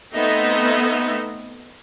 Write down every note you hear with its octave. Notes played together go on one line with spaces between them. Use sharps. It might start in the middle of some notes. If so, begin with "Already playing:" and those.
A3 B3 C4 D#4 D#5 E5